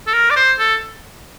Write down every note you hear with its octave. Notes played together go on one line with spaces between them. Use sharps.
A4
A#4
D5
C5
A4